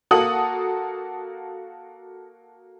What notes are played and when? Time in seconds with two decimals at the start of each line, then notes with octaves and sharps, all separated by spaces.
0.11 A#3 F#4 A4 D#6 F#7